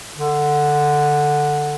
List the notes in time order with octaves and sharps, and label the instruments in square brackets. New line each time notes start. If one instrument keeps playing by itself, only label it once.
[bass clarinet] D3